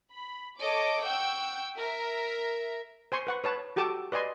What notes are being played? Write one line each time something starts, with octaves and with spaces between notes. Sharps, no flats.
B5
A4 C#5 D#5 D6
F#5 G5 C#6 E6 G6
A#4 E5
C5 G#5 C6 C#6
B4 F#5 C#6
B4 C#5 A5
F#4 G4 A4 A5 D6
B4 D5 D#5 G#5 C6